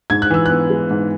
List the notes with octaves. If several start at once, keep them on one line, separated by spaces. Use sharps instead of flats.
G#2 G#6
F#6
E3 E6
B3 F#6
G#3
G#2